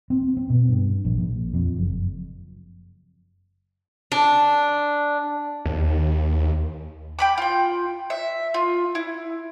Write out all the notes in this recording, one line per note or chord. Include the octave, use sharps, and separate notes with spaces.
C4
C4
B2
G2
A#1
A#1
F2
F#1
D4
D#2
G5 B5 D6
F4 G5
E5
F4
E4